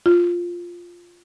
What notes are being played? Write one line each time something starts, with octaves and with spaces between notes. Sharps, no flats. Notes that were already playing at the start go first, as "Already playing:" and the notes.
F4